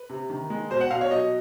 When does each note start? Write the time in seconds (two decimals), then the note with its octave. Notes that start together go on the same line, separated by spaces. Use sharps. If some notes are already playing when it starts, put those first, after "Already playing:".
Already playing: B4
0.10 C3
0.30 D#3
0.50 G#3
0.70 B2 C5
0.81 F#5
0.90 B2 F5
1.01 C#5
1.11 F#3 D#5